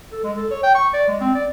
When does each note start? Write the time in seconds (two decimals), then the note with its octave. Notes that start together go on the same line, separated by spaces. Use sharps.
0.12 A4
0.24 G#3
0.37 A4
0.51 C#5
0.63 G5
0.75 C#6
0.93 D5
1.09 G#3
1.20 C4
1.35 D5